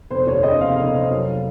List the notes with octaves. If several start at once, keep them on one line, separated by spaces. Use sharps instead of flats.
F1 C5
D#2 C#5
C#3 D#5
F1 F5
F1
F1
F#3